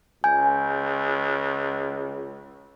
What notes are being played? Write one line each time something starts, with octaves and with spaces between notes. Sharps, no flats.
C#2 G#5 G6